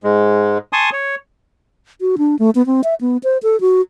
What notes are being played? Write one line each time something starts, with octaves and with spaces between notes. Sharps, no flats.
G#2 G#3
G#5 A5 C6 C#6 D#6
C#5
F#4
D4
A3
B3
C4
E5
B3
C5
A4
F#4